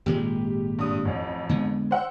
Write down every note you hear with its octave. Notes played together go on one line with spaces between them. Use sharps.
G#1 A#2 G#3 G4
G2 D#6
A1 F2
D3 G#3 B3
C5 F#5 E6